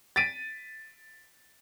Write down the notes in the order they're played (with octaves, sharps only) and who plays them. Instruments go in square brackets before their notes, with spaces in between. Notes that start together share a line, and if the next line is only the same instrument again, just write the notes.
[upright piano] A6 B6 D7 D#7